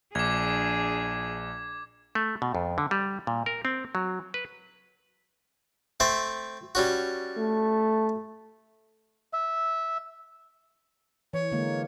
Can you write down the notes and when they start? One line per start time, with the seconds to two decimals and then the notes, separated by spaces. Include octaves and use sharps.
0.15 A#1 D4 G#4 D6 G#6
2.15 A3
2.42 B2
2.55 F2
2.78 D3
2.91 G3
3.27 A#2
3.46 A#4
3.65 C4
3.95 F#3
4.34 B4
6.00 A3 C4 E5
6.75 G3 C#4 F#4
7.38 A3
9.33 E5
11.33 E3 C#5
11.52 D3 G#3 A#3